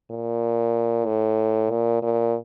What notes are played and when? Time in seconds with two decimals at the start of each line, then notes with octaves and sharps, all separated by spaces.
0.11 A#2
1.06 A2
1.70 A#2
2.02 A#2